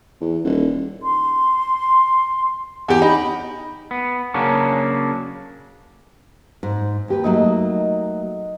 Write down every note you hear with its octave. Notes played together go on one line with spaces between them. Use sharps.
E2
D#1
C6
E2 G4
D#4 B5
B3
C#3 F#3 A#3 C#4 D4
G#2
D#2 G4 B4
F#3 A3 A#3 D#4